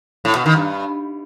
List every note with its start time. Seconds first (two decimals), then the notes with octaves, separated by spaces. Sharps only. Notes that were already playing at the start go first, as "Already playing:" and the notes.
0.25 A2
0.35 B2
0.46 D#3
0.56 G2